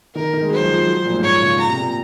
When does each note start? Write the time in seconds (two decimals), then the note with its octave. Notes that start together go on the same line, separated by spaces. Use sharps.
0.15 D#3 A#4
0.33 D#3
0.43 G#3
0.51 F#3 C5
0.63 F3
0.70 F#3
0.75 F3
0.87 F#3
0.96 F3
1.05 A#2
1.14 G#2
1.23 A#2 C#5
1.42 C#3
1.59 A#2 A#5
1.69 C3
1.77 A#2